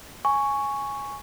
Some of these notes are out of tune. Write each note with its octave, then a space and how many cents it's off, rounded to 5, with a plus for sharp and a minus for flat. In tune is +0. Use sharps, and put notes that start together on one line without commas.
G#5 +0 C#6 +0